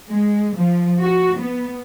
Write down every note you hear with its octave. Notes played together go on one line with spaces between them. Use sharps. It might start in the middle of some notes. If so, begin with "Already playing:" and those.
G#3
F3
F#4
B3